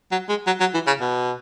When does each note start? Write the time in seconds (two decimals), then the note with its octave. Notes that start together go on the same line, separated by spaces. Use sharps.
0.12 F#3
0.29 G#3
0.47 F#3
0.60 F#3
0.74 E3
0.87 C#3
1.01 B2